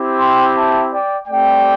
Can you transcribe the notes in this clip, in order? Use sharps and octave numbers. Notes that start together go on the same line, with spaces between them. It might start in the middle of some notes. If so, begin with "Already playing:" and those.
Already playing: C4 E4 G4
G5 C6
E5 A5
D5 G5
A3 C4 G4 D5 G5